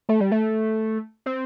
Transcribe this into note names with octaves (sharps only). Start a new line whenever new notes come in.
A3
G3
A3
C4